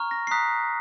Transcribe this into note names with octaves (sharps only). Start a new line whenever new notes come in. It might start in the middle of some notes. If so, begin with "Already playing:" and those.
Already playing: A#5 C#6 F6
A#6
C7
A#5 D#6 F#6 B6